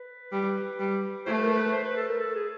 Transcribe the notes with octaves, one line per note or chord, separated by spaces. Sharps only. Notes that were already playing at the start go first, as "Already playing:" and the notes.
Already playing: B4
G3
G3
A3 C5
B4
A#4
B4
C5
B4
A4
A#4
A4
G#4